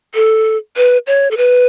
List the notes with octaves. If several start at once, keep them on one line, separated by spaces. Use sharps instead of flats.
A4
B4
C#5
A4
B4